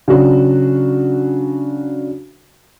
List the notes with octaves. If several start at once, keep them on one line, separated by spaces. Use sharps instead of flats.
C#3 F#3 D4 F#4